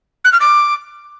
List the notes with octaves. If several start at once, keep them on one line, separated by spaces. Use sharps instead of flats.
F#6
F6
D6